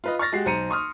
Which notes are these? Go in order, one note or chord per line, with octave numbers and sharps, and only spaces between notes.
F4 B4 D#5
C#6 F6 A6 A#6
G#3 F#4 G4 C7
B1 C5 A#5 C#7 D#7
C6 C#6 D#6 F6